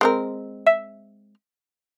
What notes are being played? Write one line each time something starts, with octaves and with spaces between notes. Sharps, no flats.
G#3 C4 A#4
E5